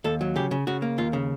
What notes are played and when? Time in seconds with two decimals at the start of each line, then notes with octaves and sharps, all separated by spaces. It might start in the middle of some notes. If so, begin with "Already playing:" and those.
0.04 D#2 A4
0.21 F#3
0.36 C#3 G4
0.51 C#3
0.67 C#3 F#4
0.82 A#3
0.98 D#2 F4
1.13 C#3